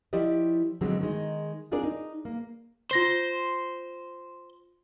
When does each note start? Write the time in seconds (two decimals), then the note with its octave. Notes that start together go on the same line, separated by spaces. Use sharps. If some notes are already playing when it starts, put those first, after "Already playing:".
0.13 F3 E4 G4 D5 D#5
0.81 B2 D3 F3 F#3 G#3 C4
1.01 D#3 G#3 D#4
1.71 C4 D4 F4 G#4 A#4 D5
1.83 D#4
2.25 A#3
2.91 F4 C5 A#6 G7